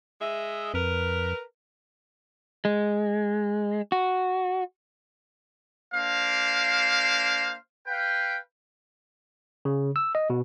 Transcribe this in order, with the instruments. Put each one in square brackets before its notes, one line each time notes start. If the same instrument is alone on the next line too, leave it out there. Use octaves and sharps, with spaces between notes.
[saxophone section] G#3 D#5 E5
[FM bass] F2 [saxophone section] A#4 B4
[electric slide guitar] G#3
F#4
[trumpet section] A#3 D4 C5 F5
B4 F5 G5
[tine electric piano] C#3
E6
D#5
B2